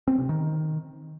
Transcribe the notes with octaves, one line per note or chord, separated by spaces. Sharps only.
C4
C3
D#3